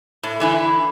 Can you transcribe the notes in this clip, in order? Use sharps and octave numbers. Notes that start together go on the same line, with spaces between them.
A2
D3 E3 E4